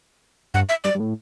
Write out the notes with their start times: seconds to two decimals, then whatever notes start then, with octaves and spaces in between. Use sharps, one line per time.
0.54 G2 F#5
0.69 E5
0.84 G2 D5
0.95 G2
1.00 A2